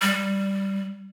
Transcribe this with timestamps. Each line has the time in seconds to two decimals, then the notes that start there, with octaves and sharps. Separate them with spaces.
0.02 G3